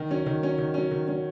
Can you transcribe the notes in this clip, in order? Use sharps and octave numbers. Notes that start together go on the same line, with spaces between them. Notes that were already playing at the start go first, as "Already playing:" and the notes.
Already playing: D#3
F#3 C#4
D#3
F#3 C#4
D#3
F#3 C#4
D#3
F#3 C#4